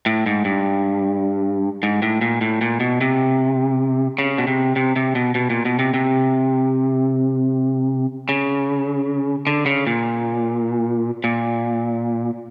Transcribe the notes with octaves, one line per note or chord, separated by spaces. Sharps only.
A2
G#2
G2
G#2
A2
A#2
A2
A#2
B2
C3
C#3
B2
C3
C3
C3
B2
B2
A#2
B2
C3
C3
C#3
D3
C#3
A#2
A#2